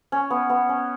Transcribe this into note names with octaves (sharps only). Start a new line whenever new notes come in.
C#4
B3
B3
C#4